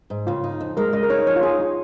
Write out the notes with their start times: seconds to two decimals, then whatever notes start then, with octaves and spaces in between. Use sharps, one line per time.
0.10 G#2
0.27 C#3 F4
0.44 D#4
0.61 F2
0.77 G#3 A#4
0.93 C#3 D#5
1.03 A#4
1.10 D#4 C#5
1.27 F3 C#5
1.36 F4
1.43 D#4 G#4
1.60 F4